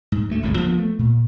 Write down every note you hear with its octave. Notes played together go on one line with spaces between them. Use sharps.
G#2
D2 A3
G1 C#2 A2 C#3
D2 F3 A#3 B3
A3
A#2